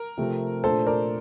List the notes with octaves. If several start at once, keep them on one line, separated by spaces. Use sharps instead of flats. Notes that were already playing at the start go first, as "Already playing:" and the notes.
Already playing: A#4
C3 F3 A3 C4
A#2 A3 D4 A4 C5
A#4 D5